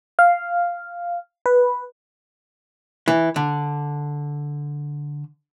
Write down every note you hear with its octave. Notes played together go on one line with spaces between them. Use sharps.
F5
B4
E3
D3